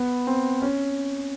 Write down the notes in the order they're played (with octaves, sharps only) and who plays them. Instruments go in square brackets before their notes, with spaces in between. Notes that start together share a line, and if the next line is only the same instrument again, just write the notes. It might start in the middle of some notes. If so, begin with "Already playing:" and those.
Already playing: [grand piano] B3
C4
C#4